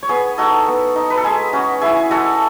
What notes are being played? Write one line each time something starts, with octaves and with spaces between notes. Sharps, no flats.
C#5
B3 G#4 B4
D#4 F#4 A4
B3
D#4
B4
A4
G#3 G#4
C#4 F#4
E4 G#4
G#3 F#4 A4